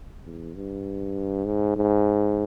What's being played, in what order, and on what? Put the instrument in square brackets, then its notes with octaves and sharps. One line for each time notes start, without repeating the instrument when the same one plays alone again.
[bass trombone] E2
G2
G#2
G#2